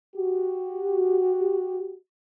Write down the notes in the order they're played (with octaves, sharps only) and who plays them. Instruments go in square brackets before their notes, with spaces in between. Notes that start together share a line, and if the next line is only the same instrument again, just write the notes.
[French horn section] F#4 G4